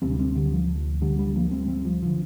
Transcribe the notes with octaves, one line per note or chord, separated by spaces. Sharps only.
D2 C3 G3 C4
D4
G3 C4
D3 G3
F3
D3 G3
D3 G3
F3 A#3
G3 C4
G3 C4
F3
D3 F3